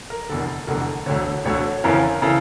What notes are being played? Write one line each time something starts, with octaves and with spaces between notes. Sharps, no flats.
A#4
F1 E2 D3 A4
F1 E2 D3 A#4
E1 D2 D3 C#5
E1 D2 D3 C#5
G1 F2 C#3 E3 A#4
C#3 E3 A4